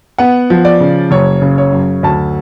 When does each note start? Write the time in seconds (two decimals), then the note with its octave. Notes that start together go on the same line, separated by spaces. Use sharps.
0.18 B3 F#5
0.50 F3
0.65 D5
0.80 C#3
1.11 F#1 C#5
1.42 C#3
1.58 C#5
1.72 F#2
2.03 D2 A5